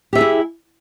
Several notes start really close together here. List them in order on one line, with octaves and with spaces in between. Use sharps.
G4 E5 G#4 E4